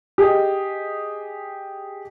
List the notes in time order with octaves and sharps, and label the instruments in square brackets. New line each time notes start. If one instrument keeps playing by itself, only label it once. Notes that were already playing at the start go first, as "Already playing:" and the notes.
[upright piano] G4 G#4 D#5